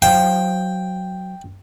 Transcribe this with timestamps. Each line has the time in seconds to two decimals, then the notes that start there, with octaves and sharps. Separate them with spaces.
0.02 F#3 C5 F5 G5